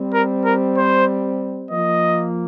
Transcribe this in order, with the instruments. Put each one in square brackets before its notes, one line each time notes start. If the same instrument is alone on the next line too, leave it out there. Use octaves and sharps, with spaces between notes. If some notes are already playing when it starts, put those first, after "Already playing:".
Already playing: [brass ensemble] G3 C4
[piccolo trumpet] A#4
A#4
C5
[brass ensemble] F3 A#3 [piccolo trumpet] D#5